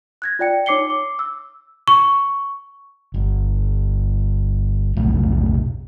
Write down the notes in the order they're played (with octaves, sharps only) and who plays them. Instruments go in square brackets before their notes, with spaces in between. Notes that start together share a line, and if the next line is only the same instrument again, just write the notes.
[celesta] F#6 G#6 A#6
F4 D5 G5 C#7
D#4 C#5 D6 C7 C#7 G7
D6
E6
C#6
[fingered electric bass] G1
F1 B1 A2